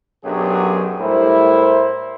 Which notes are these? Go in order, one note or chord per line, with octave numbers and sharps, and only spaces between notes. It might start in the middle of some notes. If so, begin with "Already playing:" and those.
B1 F#2 F#3 D4 G4 G#4
A2 G3 E4 A#4 C5